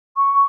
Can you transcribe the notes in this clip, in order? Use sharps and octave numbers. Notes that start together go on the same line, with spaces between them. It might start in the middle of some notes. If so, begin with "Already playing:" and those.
C#6